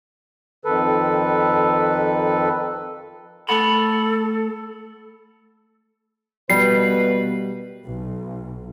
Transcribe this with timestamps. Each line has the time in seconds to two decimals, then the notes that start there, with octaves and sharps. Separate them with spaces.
0.65 F2 D#3 A4 B4
3.49 A3 A4 F#5 B5
6.50 B2 G3 A3 A#3 B4 C7
7.85 B1